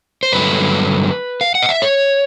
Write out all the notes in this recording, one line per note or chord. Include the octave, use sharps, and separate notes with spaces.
C5
G2 D3 F#3 A3 B4
F5
F#5
D#5
E5
C#5